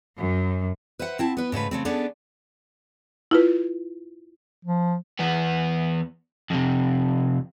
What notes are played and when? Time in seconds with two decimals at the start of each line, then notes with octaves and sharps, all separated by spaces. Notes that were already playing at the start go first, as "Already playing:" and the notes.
0.17 F#2
0.99 B4 C5 E5 F#5
1.19 C4 E4 A5
1.37 B3 B4
1.52 G#2 C#3 A3 B4
1.71 C#3 A3 C4
1.85 B3 C#4 D4 G#4 A4
3.31 E4 F4 B4
4.65 F3
5.19 E2 B3
6.51 F2 C3